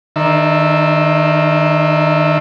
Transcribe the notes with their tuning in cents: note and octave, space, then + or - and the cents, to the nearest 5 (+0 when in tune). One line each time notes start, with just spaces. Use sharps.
D#3 +0 D4 +35 E5 +0